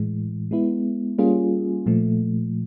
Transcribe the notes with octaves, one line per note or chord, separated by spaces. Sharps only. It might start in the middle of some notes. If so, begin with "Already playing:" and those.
Already playing: A2 E3 G#3
G#3 B3 E4
G3 A#3 C#4 F4 G#4
A#2 F3 A3